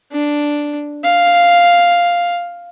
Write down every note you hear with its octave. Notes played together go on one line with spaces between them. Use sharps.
D4
F5